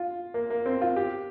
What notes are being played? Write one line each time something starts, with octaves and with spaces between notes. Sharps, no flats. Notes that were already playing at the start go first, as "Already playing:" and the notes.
Already playing: F4
A#3
A#3
C4
F4
G4